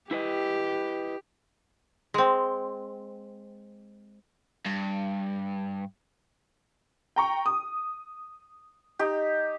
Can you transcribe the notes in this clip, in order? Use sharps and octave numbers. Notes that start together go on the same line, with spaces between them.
E4 G4 B4 D#5
G#3 C4
G2
G5 A#5 C#6
D#6
D#4 G4